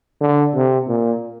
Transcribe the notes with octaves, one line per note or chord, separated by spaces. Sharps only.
D3
C3
A#2